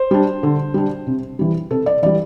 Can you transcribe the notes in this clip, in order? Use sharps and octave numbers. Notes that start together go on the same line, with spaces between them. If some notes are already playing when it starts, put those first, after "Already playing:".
Already playing: C5
G3 D4
D3
G3 D4
C3
E3 G3
C3 A4
D5
E3 G3 D5